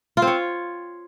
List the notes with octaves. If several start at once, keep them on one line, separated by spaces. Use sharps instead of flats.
F4
C4
C#5